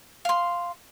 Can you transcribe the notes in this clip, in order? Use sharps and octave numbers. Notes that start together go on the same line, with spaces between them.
F5 C6